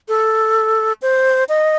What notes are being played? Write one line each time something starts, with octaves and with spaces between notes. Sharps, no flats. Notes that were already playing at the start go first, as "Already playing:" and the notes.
A4
C5
D#5